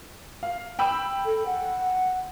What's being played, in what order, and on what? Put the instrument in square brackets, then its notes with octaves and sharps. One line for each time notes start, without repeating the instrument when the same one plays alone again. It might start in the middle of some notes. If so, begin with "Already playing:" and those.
[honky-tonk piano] F5
G5 B5 E6
[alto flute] A4
F#5